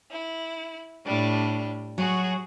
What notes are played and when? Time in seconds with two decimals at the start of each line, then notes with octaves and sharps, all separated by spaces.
0.10 E4
1.06 A2 G3 D4
1.98 F#3 F#4 G#4